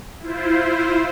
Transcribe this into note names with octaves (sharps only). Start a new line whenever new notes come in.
E4 F4 C5